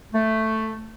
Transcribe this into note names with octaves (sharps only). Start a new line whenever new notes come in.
A3